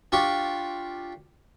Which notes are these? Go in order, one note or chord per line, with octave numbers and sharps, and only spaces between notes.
D4 F4 G4 C#6